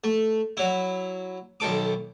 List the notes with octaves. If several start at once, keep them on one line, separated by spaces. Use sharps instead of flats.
A3
F#3 E4
B1 D#3 A4 D6